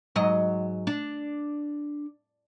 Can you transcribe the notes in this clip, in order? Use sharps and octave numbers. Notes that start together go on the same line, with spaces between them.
G#2 F#3 D#5
D4